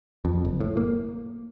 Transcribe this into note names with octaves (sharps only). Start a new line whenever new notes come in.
F2
F#1
A2
A#3